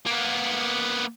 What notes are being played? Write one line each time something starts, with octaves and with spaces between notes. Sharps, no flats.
A#3 B3